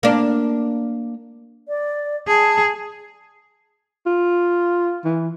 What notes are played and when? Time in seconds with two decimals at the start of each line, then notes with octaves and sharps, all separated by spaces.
0.03 A#3 D4
1.68 D5
2.28 G#4 A5
4.07 F4
5.04 E3